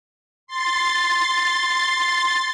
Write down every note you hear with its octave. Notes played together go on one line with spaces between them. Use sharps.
C6 A6